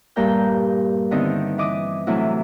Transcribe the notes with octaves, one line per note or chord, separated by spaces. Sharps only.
G2 A#2 A#4 G5 G6
D3 D#3 B3 C4 D#4 E4
E3 D#5 D6 D#6
A2 C3 E3 F#3 E4 F#4